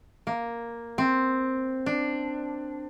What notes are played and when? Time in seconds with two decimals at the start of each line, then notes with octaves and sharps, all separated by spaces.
0.27 A#3
0.98 C4
1.86 D4